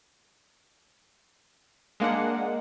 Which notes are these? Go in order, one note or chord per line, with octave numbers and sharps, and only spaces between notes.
G#3 A#3 D4 F#5